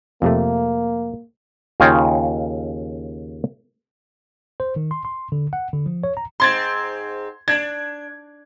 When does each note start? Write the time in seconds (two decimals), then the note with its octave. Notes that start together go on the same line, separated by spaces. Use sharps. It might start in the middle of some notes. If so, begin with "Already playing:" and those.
0.22 F2 C3 A3 A#3
1.80 D#2 C#3 F4 C#5 D#5 G5
4.60 C5
4.76 D#3
4.91 C6
5.05 C6
5.32 D3
5.53 F#5
5.73 D3
5.86 F3
6.04 C#5
6.17 A#5
6.40 G#2 C4 C6 G#6 A6
7.48 D4 G#6